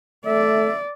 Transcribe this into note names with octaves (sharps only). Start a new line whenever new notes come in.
A3 D5 E5